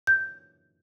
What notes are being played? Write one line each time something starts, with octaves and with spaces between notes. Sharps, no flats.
G6